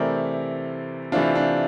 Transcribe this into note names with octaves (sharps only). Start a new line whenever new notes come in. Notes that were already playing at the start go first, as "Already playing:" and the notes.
Already playing: C3 E3 A3 C4 A#4 D5
C3 E3 A3 C4 D4 F4
D4